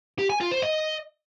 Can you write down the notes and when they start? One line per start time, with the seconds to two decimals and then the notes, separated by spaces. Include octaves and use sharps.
0.19 G4
0.30 G#5
0.40 F4
0.51 C5
0.62 D#5